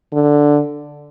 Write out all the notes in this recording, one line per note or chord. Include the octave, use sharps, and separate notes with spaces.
D3